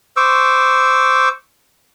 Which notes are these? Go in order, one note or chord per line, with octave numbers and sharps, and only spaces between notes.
C5 C#6 D6 E6